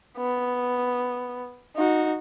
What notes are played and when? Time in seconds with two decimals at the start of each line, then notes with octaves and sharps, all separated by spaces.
0.18 B3
1.76 D#4 F#4